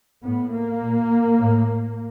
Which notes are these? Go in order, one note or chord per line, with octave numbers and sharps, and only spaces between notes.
A2 B3
A#3
A#2
A2